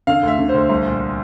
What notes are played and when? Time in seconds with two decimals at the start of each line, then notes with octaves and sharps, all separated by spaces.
0.07 D3 F5
0.23 D2 E5
0.39 D3
0.49 D2 C5
0.70 C2
0.85 A#2